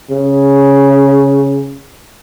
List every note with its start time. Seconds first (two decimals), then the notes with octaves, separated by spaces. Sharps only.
0.11 C#3